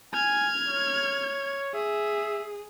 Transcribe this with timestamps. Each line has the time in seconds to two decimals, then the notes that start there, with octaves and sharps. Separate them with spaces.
0.14 G#5 F6 G#6
0.67 C#5
1.75 G#4 E5